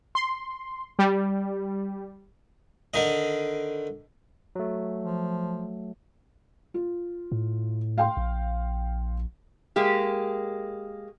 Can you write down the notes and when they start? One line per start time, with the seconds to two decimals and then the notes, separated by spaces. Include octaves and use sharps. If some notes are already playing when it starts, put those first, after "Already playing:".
0.15 C6
0.99 G3
2.94 D3 D#3 D#5
4.55 F#3 A3
5.04 F3
6.74 F4
7.32 A2
7.98 F5 G5 C6
8.17 A#1
9.76 G#3 A#3 G4